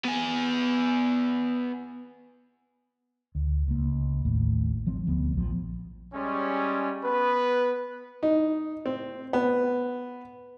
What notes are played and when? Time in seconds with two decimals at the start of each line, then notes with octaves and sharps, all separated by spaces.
0.05 B3 G#5
3.35 D2
3.68 C#2 A#3
4.25 A1 D#2 A2
4.87 F3 F#3 C4
5.06 E1 D2 F3 B3
5.33 A#1 F3
6.14 G3 G#3 C#4
7.04 B3 B4
8.23 D#4
8.86 C4
9.33 B3